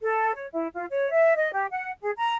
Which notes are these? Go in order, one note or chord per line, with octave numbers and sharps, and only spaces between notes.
A4
C#5
E4
F4
C#5
E5
D#5
G4
F#5
G#4
A#5